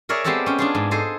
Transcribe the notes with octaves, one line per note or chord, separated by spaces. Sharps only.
G#4 A#4 C#5 D5 E5
G#3 B3 C4 G4 A4 D5
C#4 G5
D4 F4 G#4
G#2
G#4 A4 C5 D#5